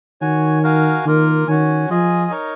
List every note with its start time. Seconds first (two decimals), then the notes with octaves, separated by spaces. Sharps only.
0.21 D#3 F#4 C#5 G#5
0.63 F#4 A#4 F5 G#5
1.05 D#3 A#3 F4 A#4
1.48 D#3 C#4 F#4 C#5 G#5
1.89 F3 F4 G#4 D#5 G#5
2.31 D#4 A#4 C#5